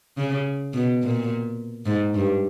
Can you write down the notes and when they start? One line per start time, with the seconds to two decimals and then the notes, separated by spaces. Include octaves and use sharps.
0.17 C#3
0.73 B2
1.02 A#2
1.86 G#2
2.14 G2